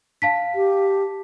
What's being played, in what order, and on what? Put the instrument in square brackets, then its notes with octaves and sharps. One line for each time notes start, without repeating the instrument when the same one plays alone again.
[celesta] F5 A5 B6
[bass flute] G4